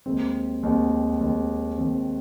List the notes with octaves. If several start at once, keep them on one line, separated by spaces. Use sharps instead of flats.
D#2 D#3 G#3 C4
D#2 D#3 G#3 C4
D#2 D#3 G#3 C4
D#2 D#3 G#3 C4